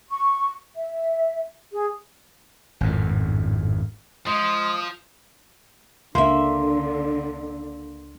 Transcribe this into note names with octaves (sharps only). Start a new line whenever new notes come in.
C#6
E5
G#4
G#1 F2 A2
F3 G#3 D#6
C#2 D3 A#3 E5 C6